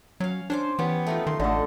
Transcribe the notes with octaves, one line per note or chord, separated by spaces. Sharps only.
F#3 C#4 F5
C#4 D4 C5 D6
E3 B3 C#4 G4
A3 D#4 F4
D#3 C6
A1 D3 A3 A4 D#5